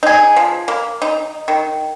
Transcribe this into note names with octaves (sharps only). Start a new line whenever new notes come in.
D#4 G#4
F3
A#3
D#4
D#3